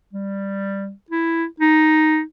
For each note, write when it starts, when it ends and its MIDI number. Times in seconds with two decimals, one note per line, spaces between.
0.13 0.92 55
1.10 1.45 64
1.60 2.22 63